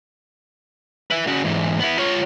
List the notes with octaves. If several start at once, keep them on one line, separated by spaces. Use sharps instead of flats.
B4 E5
C#3 F#4
G#2 E3
B3 E4
F4 C#5